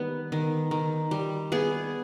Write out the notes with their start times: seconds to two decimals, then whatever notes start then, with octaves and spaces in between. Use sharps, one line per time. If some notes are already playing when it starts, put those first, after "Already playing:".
Already playing: D#3 G3 B3
0.32 D#3
0.71 D#3
1.11 G3
1.52 B3 G#4